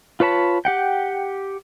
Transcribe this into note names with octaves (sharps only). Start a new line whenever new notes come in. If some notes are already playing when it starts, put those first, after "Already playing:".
F4 B4 C#5 A5 B5
G4 F#5 G5